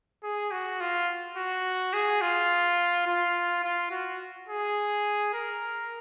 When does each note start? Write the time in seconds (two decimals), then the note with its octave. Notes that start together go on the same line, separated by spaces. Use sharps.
0.23 G#4
0.51 F#4
0.80 F4
1.37 F#4
1.93 G#4
2.21 F4
3.07 F4
3.64 F4
3.91 F#4
4.48 G#4
5.34 A#4